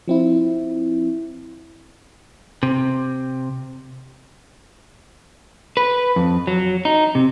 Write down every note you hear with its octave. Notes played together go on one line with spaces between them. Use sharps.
F3 C4 E4
C3
B4
F2
F#3
D#4
C3